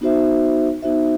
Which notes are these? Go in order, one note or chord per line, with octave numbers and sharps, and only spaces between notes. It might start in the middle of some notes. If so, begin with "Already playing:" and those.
B3 D#4 F#4 C5 E5
B3 D#4 F#4 C5 E5